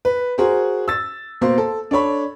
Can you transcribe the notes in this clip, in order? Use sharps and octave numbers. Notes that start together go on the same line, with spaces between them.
B4
F#4 G#4 A#4 C5
E6 A6
B2 A#3 C5 C6
A4
D4 A4 C#5 B5